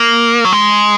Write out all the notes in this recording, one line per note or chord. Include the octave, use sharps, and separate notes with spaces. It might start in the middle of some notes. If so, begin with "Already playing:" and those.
Already playing: A#3
F#3
G#3